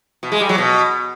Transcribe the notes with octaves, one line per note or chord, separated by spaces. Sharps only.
B2
G#3
G3
F#3
B2